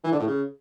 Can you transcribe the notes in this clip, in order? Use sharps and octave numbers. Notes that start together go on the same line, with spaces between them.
E3
D3
A2
C#3